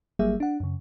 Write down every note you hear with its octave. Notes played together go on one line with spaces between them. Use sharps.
G1 F#3 G3 A#3 G#4 E5
D4 F#5
F#2 C#3